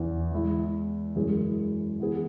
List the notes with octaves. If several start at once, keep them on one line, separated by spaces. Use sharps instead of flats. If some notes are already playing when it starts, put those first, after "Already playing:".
Already playing: E2 E3 B3
E3 G#3 E4
F#2 E3 G#3 C#4 G#4
E3 B3 E4 G#4